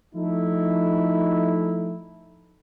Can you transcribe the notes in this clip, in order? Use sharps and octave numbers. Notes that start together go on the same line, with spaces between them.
F3 A3 D#4 E4